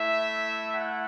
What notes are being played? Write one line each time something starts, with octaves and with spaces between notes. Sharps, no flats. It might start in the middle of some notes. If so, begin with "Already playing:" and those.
Already playing: A3 E4 E5
F#5